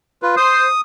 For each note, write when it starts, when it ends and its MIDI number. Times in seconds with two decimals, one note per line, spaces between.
0.22 0.35 65
0.22 0.35 71
0.37 0.65 72
0.37 0.81 87